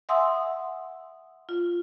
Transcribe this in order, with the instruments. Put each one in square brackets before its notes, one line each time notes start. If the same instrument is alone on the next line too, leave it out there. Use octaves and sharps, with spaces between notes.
[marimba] E5 F#5 G#5 C6 D#6 E6
F4